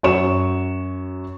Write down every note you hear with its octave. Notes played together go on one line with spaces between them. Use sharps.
F#2 F#4 C#5 C#6 E7